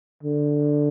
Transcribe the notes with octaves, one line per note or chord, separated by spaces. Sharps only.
D3